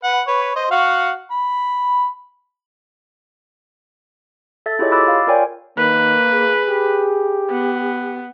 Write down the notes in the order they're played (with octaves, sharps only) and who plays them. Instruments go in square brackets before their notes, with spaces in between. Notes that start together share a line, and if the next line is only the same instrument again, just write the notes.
[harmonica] B4 F#5
B4 C#5
C5 D#5
F#4 F5 F#5
B5
[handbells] A4 E5 A6
E4 F4 G4 G#4 C#5 D#5
B5 D6 E6 F#6 A6
F5
F4 A#4 C#5 D5 G5 G#5
[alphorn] D#3 [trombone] A#3 [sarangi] B4
[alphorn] G#4
[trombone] G4
[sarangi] B3